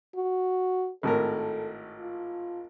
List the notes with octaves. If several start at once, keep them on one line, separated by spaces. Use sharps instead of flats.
F#4
G#1 A2 A4 A#4
F4